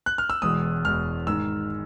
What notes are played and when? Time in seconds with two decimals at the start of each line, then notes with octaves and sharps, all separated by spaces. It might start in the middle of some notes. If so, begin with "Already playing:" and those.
0.06 F#6
0.18 F6
0.30 E6
0.42 E1 E2 B2 G#3 D#6
0.84 E1 E2 B2 G#3 F6
1.27 G#2 D#3 G#3 E6